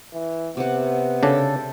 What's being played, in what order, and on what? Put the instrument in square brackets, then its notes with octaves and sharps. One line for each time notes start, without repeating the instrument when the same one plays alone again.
[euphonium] E3
[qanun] C3 F#5 [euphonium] B3
[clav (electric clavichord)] C#3 D4 [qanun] A4 G5